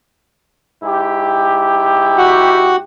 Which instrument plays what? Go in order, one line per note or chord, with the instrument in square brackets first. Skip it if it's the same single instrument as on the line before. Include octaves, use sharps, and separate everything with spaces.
[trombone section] G#2 E4 G4
[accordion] F#4 F#5